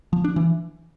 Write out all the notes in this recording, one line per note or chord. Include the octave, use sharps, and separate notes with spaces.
F3
D4
E3